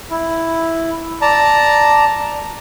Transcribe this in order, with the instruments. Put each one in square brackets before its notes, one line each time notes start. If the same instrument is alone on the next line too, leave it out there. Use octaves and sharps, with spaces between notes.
[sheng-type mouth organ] E4
D5 A5 A#5